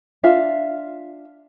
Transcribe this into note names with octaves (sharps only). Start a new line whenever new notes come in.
D4 F4 E5 F5